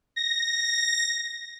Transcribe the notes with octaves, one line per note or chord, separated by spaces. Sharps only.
A#6